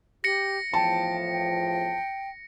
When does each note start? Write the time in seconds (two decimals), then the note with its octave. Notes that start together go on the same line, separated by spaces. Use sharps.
0.24 G4 A#6 C#7
0.74 E2 A2 F3 G5 A5
1.30 G5